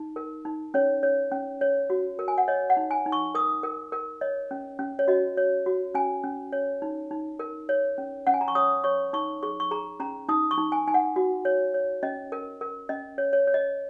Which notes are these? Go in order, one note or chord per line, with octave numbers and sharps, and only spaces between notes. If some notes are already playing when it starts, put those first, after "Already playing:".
Already playing: D#4
A#4
D#4
C#4 C#5
C#5
C#4
C#5
F#4
A#4
G#5
F#5
C#5 D#5
F#5
D#4
G#5
D#4
C#6
A#4 D#6
A#4
A#4
C#5 D#5
C#4
C#4
C#5
F#4 D#5
C#5
F#4
C#4 G#5
C#4
C#5
D#4
D#4
A#4
C#5
C#4
C#4 F#5
G#5
A#5
C#6
C#5 D#6
C#5 C#6
D#4 C#6
G#4 C#6
C#6
G#4 A#5
C#4 A#5
D#4 D#6
C#6
D#4
G#5
D#4 G#5
F#5
F#4
C#5
C#5
C#4 D#5
A#4
A#4
C#4 D#5
C#5
C#5
C#5
D#5